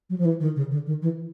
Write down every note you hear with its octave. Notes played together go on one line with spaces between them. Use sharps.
F#3
F3
E3
D#3
C#3
D3
D#3
E3